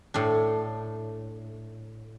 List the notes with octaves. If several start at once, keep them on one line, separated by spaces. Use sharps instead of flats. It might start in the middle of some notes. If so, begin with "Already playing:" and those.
A2 D4